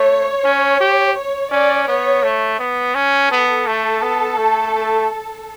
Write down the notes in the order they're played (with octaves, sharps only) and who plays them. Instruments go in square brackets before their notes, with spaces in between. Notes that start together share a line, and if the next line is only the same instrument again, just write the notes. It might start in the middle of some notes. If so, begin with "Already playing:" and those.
Already playing: [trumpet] A3 [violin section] C#5
[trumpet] C#4
G4
[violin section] C#5
[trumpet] C#4 [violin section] D5
[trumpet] B3 [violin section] C#5
[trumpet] A3
B3
C#4
[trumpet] B3 [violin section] A4
[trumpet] A3
B3
A3
A3